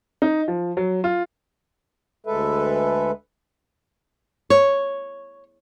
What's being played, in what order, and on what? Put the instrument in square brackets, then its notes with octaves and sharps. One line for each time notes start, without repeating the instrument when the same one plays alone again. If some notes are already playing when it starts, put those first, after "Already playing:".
[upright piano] D#4
F3
F#3
F4
[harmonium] D2 G#3 A4 B4 E5
[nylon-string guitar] C#5